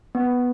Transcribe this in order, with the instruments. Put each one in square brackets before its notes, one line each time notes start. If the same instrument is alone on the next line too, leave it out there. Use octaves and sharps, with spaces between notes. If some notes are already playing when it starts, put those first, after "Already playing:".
[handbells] B3